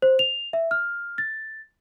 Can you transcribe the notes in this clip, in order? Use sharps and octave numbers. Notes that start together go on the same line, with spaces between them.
C5
F7
E5
F6
A6